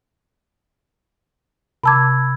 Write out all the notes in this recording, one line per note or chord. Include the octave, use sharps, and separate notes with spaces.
C3 A5 B5 D6 E6 G#6